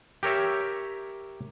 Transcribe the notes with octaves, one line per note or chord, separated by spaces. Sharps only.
G4 A#4 C#5 E5